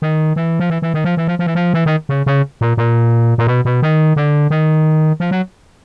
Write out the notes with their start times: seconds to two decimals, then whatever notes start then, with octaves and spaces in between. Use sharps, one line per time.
0.02 D#3
0.36 E3
0.60 F3
0.70 E3
0.82 E3
0.94 D#3
1.04 F3
1.17 E3
1.28 F3
1.39 F3
1.47 E3
1.55 F3
1.74 E3
1.86 D#3
2.09 C#3
2.26 C#3
2.61 A#2
2.77 A#2
3.38 A#2
3.47 B2
3.65 B2
3.82 D#3
4.16 D3
4.50 D#3
5.20 F3
5.31 F#3